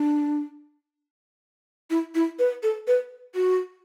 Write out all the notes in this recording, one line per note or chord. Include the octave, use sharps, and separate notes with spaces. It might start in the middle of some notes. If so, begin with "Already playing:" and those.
Already playing: D4
E4
E4
B4
A4
B4
F#4